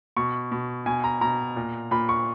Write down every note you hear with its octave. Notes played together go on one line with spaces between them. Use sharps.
B2 C#6
B2
B2 G#5
A#5
B2 A#5
A#2
A#2 B5
C#6